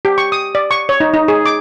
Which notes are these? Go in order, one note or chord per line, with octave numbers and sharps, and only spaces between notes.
G4
C#6
D#6
D5
C#6
C#5
D#4
D#4
G#4
D6